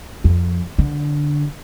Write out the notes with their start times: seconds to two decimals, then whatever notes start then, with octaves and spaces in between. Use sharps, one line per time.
0.24 F2
0.78 D3